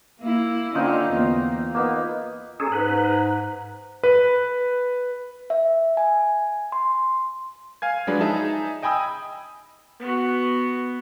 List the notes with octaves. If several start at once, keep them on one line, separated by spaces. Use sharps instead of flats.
A#3 E4
D3 C4 C#4 D#4 F4
E2 A#3
A#3 B3 D#4
C#4 G#4 A4 A#5
G#2 B4
B4
E5
G#5
C6
F5 G#5 G#6
F3 F#3 G#3 D4 G#4 B4
D#4 G#4 E5 A5
D#5 G5 G#5 B5 D#6 E6
B3 F#4